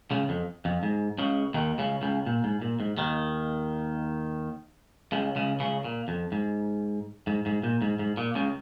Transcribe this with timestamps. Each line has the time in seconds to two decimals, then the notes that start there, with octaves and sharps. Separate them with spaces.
0.11 C#2 C#3
0.29 F2
0.65 F2
0.83 G#2
1.18 C#2 C#3
1.54 D#2 D#3
1.78 C#2 C#3
2.02 C#2 C#3
2.26 A#2
2.44 G#2
2.62 A#2
2.80 G#2
2.97 D#2 D#3
5.12 C#2 C#3
5.36 C#2 C#3
5.60 C#2 C#3
5.85 A#2
6.08 F2
6.32 G#2
7.27 G#2
7.46 G#2
7.64 A#2
7.82 G#2
7.99 G#2
8.17 A#2
8.35 C#2 C#3